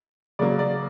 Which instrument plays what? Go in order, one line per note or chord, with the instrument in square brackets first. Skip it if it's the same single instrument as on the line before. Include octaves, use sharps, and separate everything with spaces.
[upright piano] C#3 F#3 A#3 D5
D5